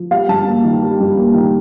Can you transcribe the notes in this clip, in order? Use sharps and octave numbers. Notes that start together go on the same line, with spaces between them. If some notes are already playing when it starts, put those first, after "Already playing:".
Already playing: F3
G3 F5
G2 A5
A#3
D#3
G3
G2
A#3
D#3